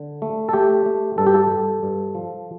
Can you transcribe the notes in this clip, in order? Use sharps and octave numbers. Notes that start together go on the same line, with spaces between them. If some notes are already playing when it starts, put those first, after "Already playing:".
Already playing: D3
A3
A4
A3 G4
A3
G2 A4
G4
A4
G2
G2
F3